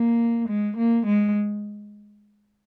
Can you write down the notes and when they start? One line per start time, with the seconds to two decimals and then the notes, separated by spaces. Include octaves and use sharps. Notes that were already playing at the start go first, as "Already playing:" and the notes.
Already playing: A#3
0.49 G#3
0.77 A#3
1.06 G#3